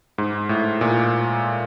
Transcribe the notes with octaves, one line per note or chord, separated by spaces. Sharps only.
G#2
A2
A#2